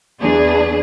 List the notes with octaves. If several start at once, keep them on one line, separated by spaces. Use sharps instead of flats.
E2 D4 G#4